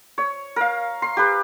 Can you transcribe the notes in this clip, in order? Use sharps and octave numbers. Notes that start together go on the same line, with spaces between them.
C#5
A#4 F5
C6
G4 B4